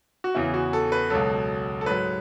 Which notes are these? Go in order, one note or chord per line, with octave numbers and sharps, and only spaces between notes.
F#4
E2 C#3 E3 E4
F#4
A4
B4
C#2 B2 F#3 A4
A4
G#2 F#3 B4